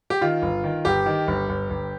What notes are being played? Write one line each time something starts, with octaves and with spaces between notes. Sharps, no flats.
G4
D#3 F4
G1
D#3
G1 G4
D#3
G1
G1
G1